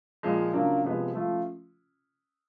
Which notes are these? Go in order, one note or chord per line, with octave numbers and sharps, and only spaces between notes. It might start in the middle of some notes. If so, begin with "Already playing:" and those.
A#2 F3 G#3
C#3 F#3 A#3 D4 F4
C3 F3 G#3 B3
F3 A3 C#4 F4